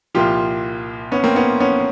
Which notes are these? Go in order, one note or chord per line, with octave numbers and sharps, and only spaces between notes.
C2 A#2 F3 F4 G4
B3 C#4
A#3 C4
B3 C#4
B3 C#4